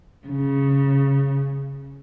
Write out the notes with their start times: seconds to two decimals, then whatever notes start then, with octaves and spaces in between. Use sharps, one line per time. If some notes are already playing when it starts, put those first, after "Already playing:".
0.28 C#3